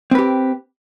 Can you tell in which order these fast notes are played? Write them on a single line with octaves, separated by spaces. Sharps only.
C4 B4 G4